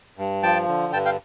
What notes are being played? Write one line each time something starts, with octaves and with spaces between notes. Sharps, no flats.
G2
F3 G5 A5
D3
G2 G5 A5
F5 G5